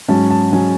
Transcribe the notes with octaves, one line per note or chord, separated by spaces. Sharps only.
G#2 F#3 C#4 A5
A5
F#3 C#4 G#5